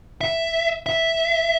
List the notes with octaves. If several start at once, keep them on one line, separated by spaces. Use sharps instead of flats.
E5
E5